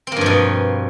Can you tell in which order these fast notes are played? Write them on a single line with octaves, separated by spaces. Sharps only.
C4 A#3 G2 F3 B2